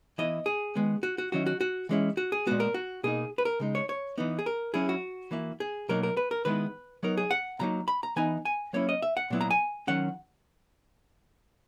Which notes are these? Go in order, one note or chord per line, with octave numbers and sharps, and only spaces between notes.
E3 B3 E4 D#5
G#4
D#3 G#3 B3
F#4
F#4
D#3 F#3 C#4 E4 F#4
F#4
F#4
E3 G#3 C#4 E4
F#4
G#4
A#2 G#3 B3 F#4
A#4
F#4
B2 A#3 D#4 G#4
B4
A#4
C#3 G#3 D#4
C#5
C#5
E3 B3 D#4
G#4
A#4
F#3 C#4 E4 G#4
F#4
E3 A#3 E4
G#4
B2 F#3 A#3 D#4 A#4
A#4
B4
A#4
D#3 G#3 B3 E4 B4
F#3 B3 D#4 A#4
G#4
F#5
B2 F#3 A#3 D#4 A#5
B5
A#5
E3 B3 D#4 G#5
G#5
F#3 A#3 C#4 E4 C#5
D#5
E5
F#5
A#2 F#3 B3 E4
A#5
G#5
D#3 F#3 C#4 F#5